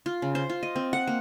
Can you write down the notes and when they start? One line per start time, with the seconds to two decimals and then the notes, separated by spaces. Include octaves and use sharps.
0.06 F4
0.22 C#3
0.35 C5
0.50 F4
0.63 D#5
0.76 C4
0.93 F#5
1.07 A#3